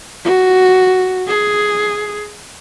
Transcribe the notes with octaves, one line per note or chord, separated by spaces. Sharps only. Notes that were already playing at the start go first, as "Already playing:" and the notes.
F#4
G#4